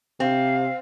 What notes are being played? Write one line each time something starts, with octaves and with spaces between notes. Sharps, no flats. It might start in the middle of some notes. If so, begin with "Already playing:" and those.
C3 C4 F5